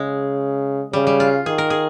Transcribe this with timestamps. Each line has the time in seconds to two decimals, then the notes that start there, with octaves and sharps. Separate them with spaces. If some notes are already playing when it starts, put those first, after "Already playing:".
Already playing: C#3 G#3
0.93 C#3 G3
1.07 G3
1.20 F4
1.46 D#3 G#4
1.58 A#4
1.70 G#4